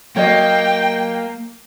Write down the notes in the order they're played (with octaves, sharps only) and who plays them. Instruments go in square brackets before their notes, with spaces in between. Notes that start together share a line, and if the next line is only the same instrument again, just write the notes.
[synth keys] F#3 [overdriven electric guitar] A#3 [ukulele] C#5 D#5 [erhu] G5